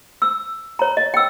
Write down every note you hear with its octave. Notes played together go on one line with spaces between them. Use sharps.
E6
C#5 A#5
D#5
G5 E6